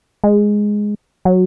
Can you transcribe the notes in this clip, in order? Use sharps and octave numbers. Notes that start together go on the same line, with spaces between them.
G#3
F#3